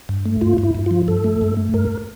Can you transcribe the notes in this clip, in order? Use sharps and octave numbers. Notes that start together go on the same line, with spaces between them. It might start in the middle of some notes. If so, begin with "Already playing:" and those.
G2
A3
G2 F4
G2
E4
G2
F3 F4
G2 A4
A3
G2
A3
G2 A#4